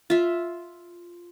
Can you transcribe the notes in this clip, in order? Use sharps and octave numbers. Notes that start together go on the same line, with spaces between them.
F4 E5